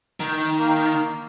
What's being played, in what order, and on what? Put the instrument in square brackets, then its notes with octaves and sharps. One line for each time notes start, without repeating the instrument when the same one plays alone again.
[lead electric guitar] D#3
[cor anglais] A#3